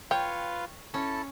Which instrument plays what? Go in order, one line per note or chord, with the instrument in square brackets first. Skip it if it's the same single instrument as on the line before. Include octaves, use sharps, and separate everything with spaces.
[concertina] F4 B4 F5 [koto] C#5 [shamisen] G5
[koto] C#4 [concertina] E4 A4 A5